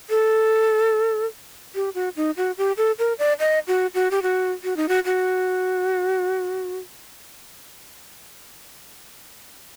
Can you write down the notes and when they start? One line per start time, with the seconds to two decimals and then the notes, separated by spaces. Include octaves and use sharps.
0.10 A4
1.75 G4
1.95 F#4
2.16 D#4
2.37 F#4
2.58 G4
2.77 A4
2.99 A#4
3.19 D5
3.40 D#5
3.67 F#4
3.94 F#4
4.11 G4
4.23 F#4
4.64 F#4
4.77 D#4
4.89 F#4
5.05 F#4